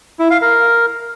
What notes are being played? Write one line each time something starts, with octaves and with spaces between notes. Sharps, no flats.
E4
F5
A#4